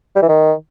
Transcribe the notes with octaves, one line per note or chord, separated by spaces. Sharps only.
G3
E3
D#3